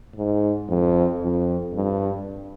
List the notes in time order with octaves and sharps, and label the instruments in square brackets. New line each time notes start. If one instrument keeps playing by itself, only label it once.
[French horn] G#2
F2
F2
G2